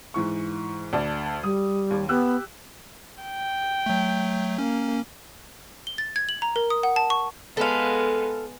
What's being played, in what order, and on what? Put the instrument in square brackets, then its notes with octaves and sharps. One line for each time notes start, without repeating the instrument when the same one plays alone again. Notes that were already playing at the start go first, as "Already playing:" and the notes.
[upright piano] G#2 E3 C#6
D2 D5 A5
[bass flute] G3 [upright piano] D#6
[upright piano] D#2
[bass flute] B3 [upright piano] G4 E6 F#6
[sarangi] G5
[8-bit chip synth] F#3 A3
[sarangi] A#3 [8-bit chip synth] C#4
[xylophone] G7
A6
G#6
F#7
A#5
A#4
D#6
F#5
A5
C#6
[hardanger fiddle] G#3 B3 [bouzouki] A4 F5